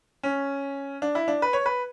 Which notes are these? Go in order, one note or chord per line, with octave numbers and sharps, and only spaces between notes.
C#4
D4
E4
D4
B4
C#5
B4